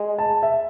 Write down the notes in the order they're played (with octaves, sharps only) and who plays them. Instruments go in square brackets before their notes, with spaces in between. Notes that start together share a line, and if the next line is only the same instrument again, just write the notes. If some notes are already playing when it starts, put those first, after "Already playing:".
Already playing: [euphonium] G#3
[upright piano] A5
E5